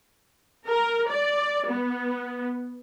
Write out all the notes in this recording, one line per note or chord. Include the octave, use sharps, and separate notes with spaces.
A#4
D5
B3